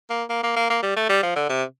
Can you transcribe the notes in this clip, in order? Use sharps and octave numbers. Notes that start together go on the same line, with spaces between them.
A#3
A#3
A#3
A#3
A#3
G3
A3
G3
F3
D3
C3